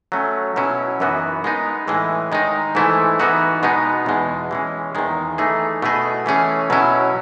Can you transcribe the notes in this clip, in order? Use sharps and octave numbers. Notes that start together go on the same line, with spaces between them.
F#3 A3 C#4
B2 F#3 C#4 E4
F#2 E3 B3 D#4 F#4
G#3 B3 D#4
A2 E3 G#3
D#3 G#3 D#4
G#2 E3 A3 E4
E3 B3 D#4 F#4
B2 G#3 B3 D#4
E2 B2 G#3
E3 G#3 C#4
E2 D#3 G#3
E3 A3 D#4 G#4
B2 A3 E4 G#4 D#5
E3 A3 C#4 G#4
B2 F#3 C#4 E4